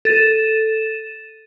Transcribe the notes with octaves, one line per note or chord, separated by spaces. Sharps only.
A4 A6 D#7 E7